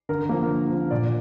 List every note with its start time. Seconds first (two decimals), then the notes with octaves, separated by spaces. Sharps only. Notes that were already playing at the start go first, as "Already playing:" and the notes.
0.09 D3 A#4
0.29 F3 A#3
0.51 D3
0.70 F3 A#3
0.91 A#2 D5